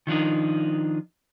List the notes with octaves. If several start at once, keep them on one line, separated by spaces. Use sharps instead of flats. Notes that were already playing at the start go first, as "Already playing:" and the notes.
D#3 F3 D4 D#4